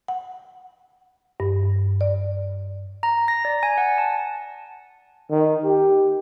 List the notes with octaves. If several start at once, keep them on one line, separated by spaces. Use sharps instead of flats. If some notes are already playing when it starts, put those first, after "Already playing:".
F#5
G2
D5
A#5
A#6
D5
G#5
F#5
A5
D#3
G4